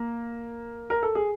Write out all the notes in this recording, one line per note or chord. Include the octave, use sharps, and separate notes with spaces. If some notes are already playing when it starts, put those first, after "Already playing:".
Already playing: A#3
A#4
A4
G#4